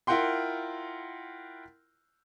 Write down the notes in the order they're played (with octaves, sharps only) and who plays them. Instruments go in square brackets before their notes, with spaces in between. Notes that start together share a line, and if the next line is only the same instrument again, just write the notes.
[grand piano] E4 F4 A#4 F#5 G5 C6